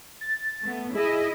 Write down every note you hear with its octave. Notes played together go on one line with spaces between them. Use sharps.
A6
A3 B3
E4 G#4 D#5